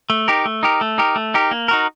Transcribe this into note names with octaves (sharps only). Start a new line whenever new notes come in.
A3
D#4 G4 A#4
A3
D#4 G4 A#4
A3
D#4 G4 A#4
A3
D#4 G4 A#4
A#3
D#4 F#4 A#4